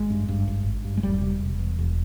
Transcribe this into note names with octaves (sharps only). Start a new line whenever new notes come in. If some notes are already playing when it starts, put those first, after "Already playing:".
Already playing: G#1 G#3
G2
G2
G#1
G#1
G2
G#3
E1 G3
C3
E1
E2
E1